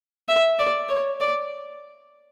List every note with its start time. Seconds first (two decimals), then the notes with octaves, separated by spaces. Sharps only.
0.29 E5
0.59 D5
0.89 C#5
1.21 D5